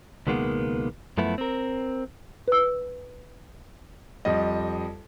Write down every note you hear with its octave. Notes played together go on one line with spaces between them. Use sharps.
C#2 B2 D#3 G#3 A#3 B3
F#2 F3 A3 B3 E4
C4 A#4
B4 E6
F2 G3 D#5